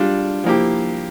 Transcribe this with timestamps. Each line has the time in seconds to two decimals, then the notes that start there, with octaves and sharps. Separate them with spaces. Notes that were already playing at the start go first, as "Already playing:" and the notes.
Already playing: G3 D4 F4
0.44 F3 A#3 E4 G4